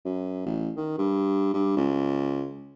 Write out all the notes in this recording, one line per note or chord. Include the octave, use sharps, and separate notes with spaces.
F#2
A1
D#3
G2
G2
C#2